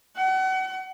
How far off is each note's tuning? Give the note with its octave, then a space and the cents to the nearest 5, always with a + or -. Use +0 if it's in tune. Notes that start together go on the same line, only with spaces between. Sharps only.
F#5 +35